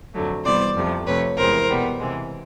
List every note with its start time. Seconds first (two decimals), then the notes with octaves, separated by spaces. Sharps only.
0.14 F2 D3 F#3 A3
0.45 C3 E3 G3 B3 C5 D5
0.76 F2 C3 F3 A3
1.06 F2 C3 F3 A3 B4 C#5
1.37 E2 C3 E3 G#3 A#4 C5
1.69 B2 G3 B3
1.99 C3 E3 G#3